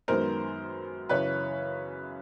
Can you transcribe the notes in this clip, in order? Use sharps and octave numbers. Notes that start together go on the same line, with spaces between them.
F#2 D#3 G#3 B3 A#4 C5
F#2 C#3 E3 B4 C#5